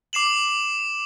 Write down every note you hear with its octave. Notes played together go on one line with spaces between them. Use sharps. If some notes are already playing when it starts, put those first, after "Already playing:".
D6 C7 E7 F#7